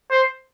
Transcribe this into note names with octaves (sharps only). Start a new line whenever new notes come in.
C5